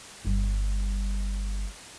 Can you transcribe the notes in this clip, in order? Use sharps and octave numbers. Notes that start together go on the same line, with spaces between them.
G1 G3